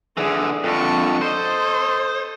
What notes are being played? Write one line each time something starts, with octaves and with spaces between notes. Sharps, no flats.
D3 E3 G#4
F2 D3 A4 C#6
A4 C5 D#5